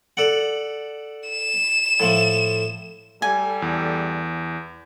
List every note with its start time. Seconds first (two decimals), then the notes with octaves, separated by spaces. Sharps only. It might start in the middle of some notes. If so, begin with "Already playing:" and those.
0.17 A4 D5 F#5
1.29 E7
2.00 A2 F3 A3
3.22 G3 A4 G#5
3.62 E2